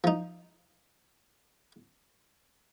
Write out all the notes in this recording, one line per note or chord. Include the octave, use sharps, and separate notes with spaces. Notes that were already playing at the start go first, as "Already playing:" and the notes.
F3 D#4